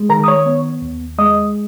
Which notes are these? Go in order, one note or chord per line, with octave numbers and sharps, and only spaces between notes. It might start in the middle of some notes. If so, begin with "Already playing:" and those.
Already playing: G#3
D#3 A#4 A#5
D#6
C#5 C#6
B3
D#2
G#3 D#5 D#6